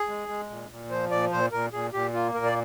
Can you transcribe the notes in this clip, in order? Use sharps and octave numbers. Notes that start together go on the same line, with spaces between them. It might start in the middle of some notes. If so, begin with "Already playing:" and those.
Already playing: G#4
G#3
G#3
A#2
A#2
F3 C5
A#2 D5
A#2 C5
A#2 A#4
A#2 G#4
A#2 G4
A#3 F4
A#2 A#4
D5